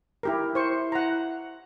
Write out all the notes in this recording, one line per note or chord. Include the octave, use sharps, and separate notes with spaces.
E4 G4 A#4
E4 C5 C#6
F#5 A#5